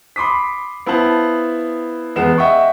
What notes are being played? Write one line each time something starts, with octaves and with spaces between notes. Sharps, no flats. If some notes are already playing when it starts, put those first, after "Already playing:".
B5 C6 D6 D#6 B6
B3 E4 C5 F5 A5 F#7
E2 G#3 B3 E7
D#5 E5 F#5 G5 C#6